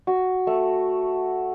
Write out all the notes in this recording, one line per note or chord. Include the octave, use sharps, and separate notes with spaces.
F#4
A3